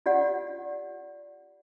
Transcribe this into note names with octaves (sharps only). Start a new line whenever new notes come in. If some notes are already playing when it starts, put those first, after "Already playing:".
F4 G4 D5 F#5